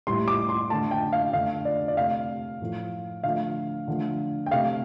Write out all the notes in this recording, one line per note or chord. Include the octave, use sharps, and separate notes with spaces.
A2 G3 C6
D6
C6
D3 A3 A5
G5
F5
D3 A3 F5
D5
D5
C3 A3 F5
A2 F3 A3
D3 F3 A3 F5
D3 F3 A3
G5
C3 A3 F5